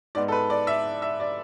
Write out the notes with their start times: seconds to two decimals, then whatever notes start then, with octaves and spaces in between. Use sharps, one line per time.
0.15 G#2 G#3 B3 D5
0.28 A4
0.32 B4
0.50 D5
0.67 E5
1.02 E5
1.20 D5